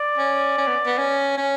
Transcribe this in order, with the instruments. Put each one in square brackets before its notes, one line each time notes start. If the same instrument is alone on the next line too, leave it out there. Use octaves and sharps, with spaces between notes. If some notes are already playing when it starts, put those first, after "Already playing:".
Already playing: [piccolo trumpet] D5
[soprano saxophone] C#4
C#4
B3
B3
C#4
C#4